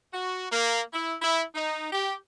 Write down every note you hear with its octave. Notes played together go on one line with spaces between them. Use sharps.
F#4
A#3
E4
E4
D#4
G4